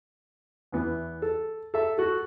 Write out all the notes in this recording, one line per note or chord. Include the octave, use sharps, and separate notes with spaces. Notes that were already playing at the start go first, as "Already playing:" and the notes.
E2 E3 B3
A4
A4 E5
F#4 A4